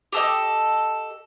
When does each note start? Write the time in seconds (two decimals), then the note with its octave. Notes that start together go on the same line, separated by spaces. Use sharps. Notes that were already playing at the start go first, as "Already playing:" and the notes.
0.12 G4 A4 D#5